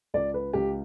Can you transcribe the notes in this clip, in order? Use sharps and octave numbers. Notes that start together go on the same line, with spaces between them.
C#2 D5
B4
C#2 G4